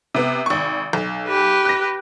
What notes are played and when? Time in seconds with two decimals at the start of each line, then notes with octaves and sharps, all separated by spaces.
0.14 C3 B3
0.46 G#1 C#6
0.93 B1
1.27 G4 B4
1.65 F#6 A#6